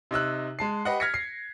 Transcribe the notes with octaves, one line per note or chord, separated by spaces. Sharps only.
C3 D#4 E6 F#6
G#3 A5 C7
G4 B4 D#5 F#5
F6 G#6 A#6 B6 C#7
C7